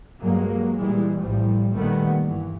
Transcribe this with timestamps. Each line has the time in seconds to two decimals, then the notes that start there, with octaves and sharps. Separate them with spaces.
0.20 G2 F#3 G#3 A#3
0.76 A#2 E3 G3 G#3
1.21 A1 A2 F3 G3
1.74 A#2 D#3 G3 A3 B3
2.24 G2 E3